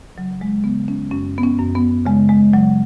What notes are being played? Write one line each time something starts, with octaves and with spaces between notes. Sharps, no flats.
C#3 F#3
G#3
C#3 B3
C#4
F#2 C#4
B3
C#4
F#2
B3
C#3 G#3
G#3
C#3 F#3